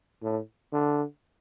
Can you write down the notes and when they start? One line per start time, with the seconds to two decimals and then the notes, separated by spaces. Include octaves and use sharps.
0.23 A2
0.73 D3